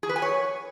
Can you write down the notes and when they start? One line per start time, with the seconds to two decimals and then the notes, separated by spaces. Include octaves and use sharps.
0.03 G#4
0.09 B4
0.16 G#5
0.22 C#5